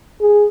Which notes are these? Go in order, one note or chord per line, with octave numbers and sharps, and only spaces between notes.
G#4